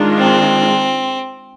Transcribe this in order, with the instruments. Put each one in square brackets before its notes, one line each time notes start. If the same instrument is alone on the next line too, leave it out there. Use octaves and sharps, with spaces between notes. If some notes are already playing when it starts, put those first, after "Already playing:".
Already playing: [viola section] D#3 G#3 D4 F4
[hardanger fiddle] C4